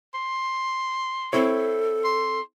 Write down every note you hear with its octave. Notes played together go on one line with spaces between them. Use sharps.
C6
C4 E4 A4 C#5
C6